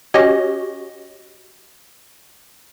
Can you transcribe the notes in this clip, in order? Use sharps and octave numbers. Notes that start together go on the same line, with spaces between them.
C#4 F#4 G4 C#5 D#5